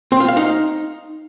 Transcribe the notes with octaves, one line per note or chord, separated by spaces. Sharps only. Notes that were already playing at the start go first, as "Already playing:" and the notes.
C4
F4
F5
D#4